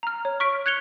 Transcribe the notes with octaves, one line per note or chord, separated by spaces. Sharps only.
A#5 F6
C#5
C#6 F6 B6 D7
F#6 G#6 C#7 F7 G7